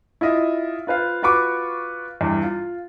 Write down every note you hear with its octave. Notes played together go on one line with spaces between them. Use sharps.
E4 F4 D#5 E5
F4 B4 C5 F5
F4 F#4 B4 C#6 D6
E2 G2
F4